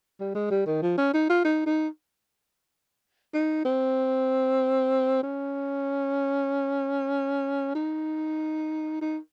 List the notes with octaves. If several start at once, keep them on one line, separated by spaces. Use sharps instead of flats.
G3
G#3
G3
D#3
F3
C#4
D#4
F4
D#4
D#4
D#4
C4
C#4
D#4
D#4